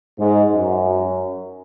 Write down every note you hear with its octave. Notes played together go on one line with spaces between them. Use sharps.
G#2
F#2